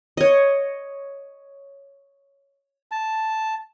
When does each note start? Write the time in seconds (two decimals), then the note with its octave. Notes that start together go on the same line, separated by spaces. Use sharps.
0.17 C#5 D#5
2.91 A5